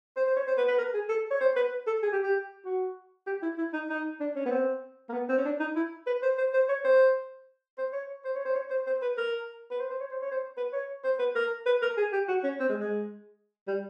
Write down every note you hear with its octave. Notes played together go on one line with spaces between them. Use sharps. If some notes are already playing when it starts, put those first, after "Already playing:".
C5
C5
C#5
C5
B4
B4
A#4
G#4
A4
C#5
C5
B4
A4
G#4
G4
G4
F#4
G4
E4
E4
D#4
D#4
D4
C#4
B3
C4
A#3
B3
C4
C#4
D4
D#4
E4
B4
C5
C5
C5
C#5
C5
C5
C#5
C5
C#5
C5
C#5
C5
C5
B4
A#4
B4
C5
C5
C#5
C5
C#5
C5
B4
C#5
C5
B4
A#4
B4
A#4
G#4
G4
F#4
C#4
C4
G#3
G#3
G3